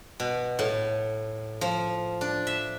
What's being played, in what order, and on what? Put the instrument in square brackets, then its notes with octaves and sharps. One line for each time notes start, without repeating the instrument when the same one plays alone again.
[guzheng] B2
A2
F3
D4
E5